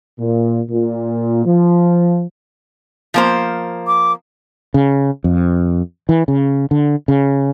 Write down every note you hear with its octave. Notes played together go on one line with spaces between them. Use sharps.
A#2
A#2
F3
F3 A#3 C5
D6
C#3
F2
E3
C#3
D3
C#3